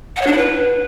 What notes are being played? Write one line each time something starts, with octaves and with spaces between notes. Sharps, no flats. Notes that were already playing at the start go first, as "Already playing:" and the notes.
F#5
C#5
D4
E4
B4